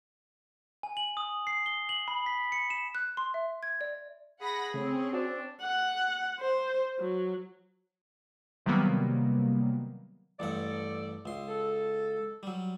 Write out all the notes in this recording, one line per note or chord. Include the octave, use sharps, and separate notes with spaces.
G#5
F#7
D#6
C7
G7
F#7
B5
B6
C#7
E7
F#6
C6
E5
G#6
D5
G#4 F#5 B5 A#6
C#3 A3 C4 C#4
D4 F#4 C5
F#5
C5
F#3
C3 D#3 F#3 G3 A#3 B3
A1 G2 A4 D5 F#5
C#2 C6
A4
F#3 G3